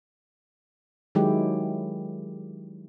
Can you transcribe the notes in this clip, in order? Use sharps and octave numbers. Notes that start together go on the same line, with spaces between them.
D#3 F#3 G#3 E4 G4